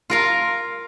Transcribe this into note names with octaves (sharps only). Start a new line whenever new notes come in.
F4 A#4 F5